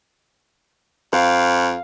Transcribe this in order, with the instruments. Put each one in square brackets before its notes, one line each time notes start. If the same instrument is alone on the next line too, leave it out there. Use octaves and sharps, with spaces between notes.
[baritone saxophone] F2 [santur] F5